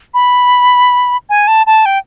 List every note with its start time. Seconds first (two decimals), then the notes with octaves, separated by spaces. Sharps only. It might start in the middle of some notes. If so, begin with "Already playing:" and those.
0.14 B5
1.29 G#5
1.47 A5
1.66 A5
1.85 G5